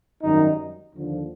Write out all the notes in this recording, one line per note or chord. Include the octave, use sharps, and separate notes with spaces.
G#1 F#2 D#3 G3 D#4
D#2 D3 F3